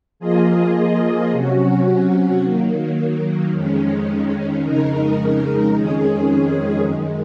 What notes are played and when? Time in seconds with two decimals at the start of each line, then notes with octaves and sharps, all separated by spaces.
0.19 F3 A#3 F4 G#4 D#5
1.31 C3 F#3 C#4 F#4
2.41 D#3 F#3 A#3
3.51 F2 D#3 G#3 C#4
4.63 F2 C#3 G#3 D#4 A#4
5.73 F2 D#3 G#3 C#4 G#4
6.84 F#2 D#3 G#3